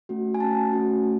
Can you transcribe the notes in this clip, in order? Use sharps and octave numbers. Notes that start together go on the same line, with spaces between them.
A3 C#4 F#4
G#5
A3 C#4 F#4 A5
A3 C#4 F#4
A3